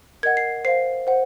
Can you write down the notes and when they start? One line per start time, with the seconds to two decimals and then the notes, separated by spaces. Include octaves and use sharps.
0.23 A#4 D#5 F#5 G#6
0.37 C7
0.65 C5 F5 C7
1.07 C5 F#5